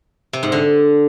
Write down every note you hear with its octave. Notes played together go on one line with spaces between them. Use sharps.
C3
G#2
D3